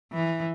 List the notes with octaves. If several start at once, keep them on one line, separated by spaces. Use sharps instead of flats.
E3